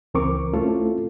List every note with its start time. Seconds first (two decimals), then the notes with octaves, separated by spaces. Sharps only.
0.14 C#2 E3 C4 A#4 C#6 D6
0.54 A3 C4 C#4 E4 F4 A4